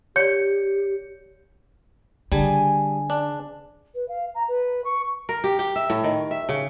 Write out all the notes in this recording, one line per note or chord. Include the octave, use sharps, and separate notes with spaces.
G4 C#5 D5 G6 C#7
D3 G3 G#4 G#5 A5
D4
B4
F5
A#5
B4
C#6
A#4
G4
G4
E5
A2
D#3
E5
C#3